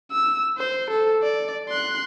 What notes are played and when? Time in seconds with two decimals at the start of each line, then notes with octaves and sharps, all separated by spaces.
0.12 E6
0.58 C5
0.91 A4
1.23 D5
1.69 C6 F#6